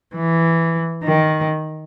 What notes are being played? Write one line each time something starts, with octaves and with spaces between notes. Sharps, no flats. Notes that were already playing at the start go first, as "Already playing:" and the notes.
E3
D#3